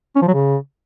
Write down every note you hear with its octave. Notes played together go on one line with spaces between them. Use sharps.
C#4
F3
F#3
C#3